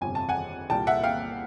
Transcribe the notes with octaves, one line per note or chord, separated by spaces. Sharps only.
G1 F2 C3 G#5
A5
F#5 G#5
C2 A#2 G3 A#3 G5 A5
E5 F#5
F5 G5